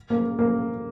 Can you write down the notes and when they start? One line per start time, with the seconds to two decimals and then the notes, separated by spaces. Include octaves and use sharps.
0.10 A#3
0.39 A#3